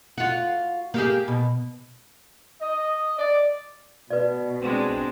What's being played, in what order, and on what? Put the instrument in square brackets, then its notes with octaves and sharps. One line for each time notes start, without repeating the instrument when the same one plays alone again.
[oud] F4 F#4
A#3 G4 G#4
B2
[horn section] D#5
D5
[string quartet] B2 [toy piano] B4 D5
[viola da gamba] G#3 D4 [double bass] C4